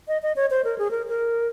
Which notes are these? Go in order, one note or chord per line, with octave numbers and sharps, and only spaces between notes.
D#5
D#5
C#5
C5
A#4
G#4
A#4
A#4